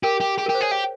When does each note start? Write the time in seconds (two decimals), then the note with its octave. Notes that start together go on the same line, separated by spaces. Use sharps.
0.03 G4 A#4
0.20 G4
0.38 G4 G#4
0.46 A#4
0.49 G4
0.55 C5
0.61 G#4 C#5
0.71 G4 F5